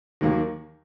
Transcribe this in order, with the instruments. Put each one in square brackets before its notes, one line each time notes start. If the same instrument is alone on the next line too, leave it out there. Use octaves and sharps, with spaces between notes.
[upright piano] D#2 D#3 F#3 A#3